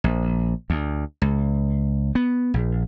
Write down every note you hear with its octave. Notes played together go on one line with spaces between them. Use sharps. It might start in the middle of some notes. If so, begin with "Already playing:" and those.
A#1
D2
C#2
B3
A#1